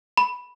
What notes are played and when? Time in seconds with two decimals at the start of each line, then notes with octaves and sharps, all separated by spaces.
0.17 B5